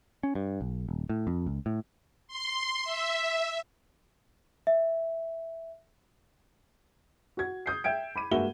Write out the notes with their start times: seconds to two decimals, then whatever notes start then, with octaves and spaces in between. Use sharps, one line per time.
0.23 C#4
0.35 G2
0.61 B1
0.89 D#1
1.09 A2
1.27 F2
1.46 C#2
1.66 A2
2.27 C6
2.84 E5
4.67 E5
7.37 F#4 G#6
7.66 D#6 G6 C7
7.84 E5 G5 G#6 D7
8.16 B5 D6 D#7
8.31 G2 G#3 A#3 F#4 E5 G7